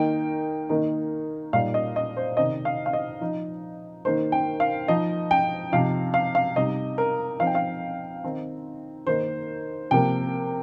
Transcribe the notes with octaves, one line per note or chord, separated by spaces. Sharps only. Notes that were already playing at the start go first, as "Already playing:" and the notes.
Already playing: D#3 A#3 D#4 G5
D#3 A#3 D#4
A#2 G3 D#4 F5
D#5
D#5
C5
C3 D#3 C4 D#4 D#5
F5
F5
D#5
F3 D#4
D#3 A#3 D#4 C5
G5
F5
F3 D#4 D#5
G5
C3 F3 D#4 F5
F5
F5
C3 G3 D#4 D#5
A#4
F3 C4 D#4 F5
G5
F5
D#3 C4 D#4
D#3 A#3 D#4 C5
C3 F3 A#3 G5